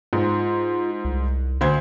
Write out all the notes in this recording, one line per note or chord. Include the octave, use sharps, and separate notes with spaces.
G#2 F4
C2
D2 C5 G#6